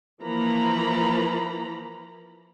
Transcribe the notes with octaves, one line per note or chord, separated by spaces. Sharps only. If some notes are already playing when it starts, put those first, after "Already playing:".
E3 F3 A#3 A#5 B5